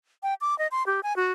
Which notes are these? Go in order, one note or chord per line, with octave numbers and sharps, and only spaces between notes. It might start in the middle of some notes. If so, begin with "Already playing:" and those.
G5
D6
D#5
C6
G4
G#5
F#4